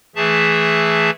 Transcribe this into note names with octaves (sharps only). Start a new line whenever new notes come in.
E3 A3 G#4 E5 A5